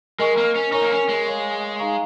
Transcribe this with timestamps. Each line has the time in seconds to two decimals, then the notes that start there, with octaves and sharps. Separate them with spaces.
0.19 G#3 A#4 D#5 C#6
0.37 A#3
0.56 C#4
0.72 D#4 A#4 C#5 G#5 C#6
0.82 A#3
0.91 C#4
1.09 G#3
1.26 C#5 F5 C#6
1.79 D#4 G#4 F5 A#5 C#6